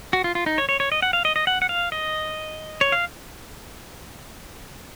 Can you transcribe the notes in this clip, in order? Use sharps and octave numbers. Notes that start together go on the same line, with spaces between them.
F#4
F4
F4
D#4
C#5
C#5
C#5
D#5
F#5
F5
D#5
D#5
F#5
F#5
F5
D#5
C#5
F5